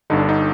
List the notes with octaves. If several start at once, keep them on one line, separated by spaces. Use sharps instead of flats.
G1 G2 D3 D#4
D4
D#4